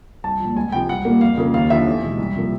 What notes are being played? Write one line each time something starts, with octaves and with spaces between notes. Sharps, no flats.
C2 A5
A#2 F3
C#2 G#5
C3 F3 G#3 G5
C2 F#5
A#2 G3 A#3
F2 F5
C#3 F3 A#3
D#2 F5
D3 F3 E5
E2
B2 G#3
C2
C3 F3 A#3